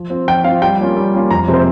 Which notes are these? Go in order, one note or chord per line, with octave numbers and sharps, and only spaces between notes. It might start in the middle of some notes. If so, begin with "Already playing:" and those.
Already playing: F3
C4 F4
F3 G5
C4 F4 F5
G3 G5
A#3 C#4 F4
G3
A#3 C#4 F4
F2 A#5
C3 F3 G#3 C4
C5